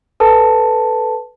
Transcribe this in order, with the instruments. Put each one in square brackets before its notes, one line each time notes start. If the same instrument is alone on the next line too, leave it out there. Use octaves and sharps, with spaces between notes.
[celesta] A4 B4 A5